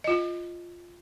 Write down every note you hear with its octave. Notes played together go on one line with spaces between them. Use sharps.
F4 D#5